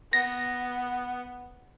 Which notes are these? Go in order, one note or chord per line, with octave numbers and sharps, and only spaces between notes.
B3 A#6